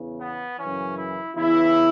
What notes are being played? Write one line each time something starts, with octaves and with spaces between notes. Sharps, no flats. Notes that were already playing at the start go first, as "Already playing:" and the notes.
Already playing: E2 C#3 E3
B3
F#2 C#3 E3 C#4
E4
E2 C#3 E3 E4